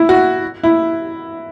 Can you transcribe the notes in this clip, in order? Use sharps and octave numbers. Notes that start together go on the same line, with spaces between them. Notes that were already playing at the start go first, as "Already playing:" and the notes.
Already playing: E4
F#4
E4